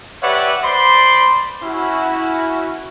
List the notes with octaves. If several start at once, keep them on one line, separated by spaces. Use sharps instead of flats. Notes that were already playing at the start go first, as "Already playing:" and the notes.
G4 B4 C#5 D5 E5 F#5
C5 D5 B5 C6
C#4 E4 F#4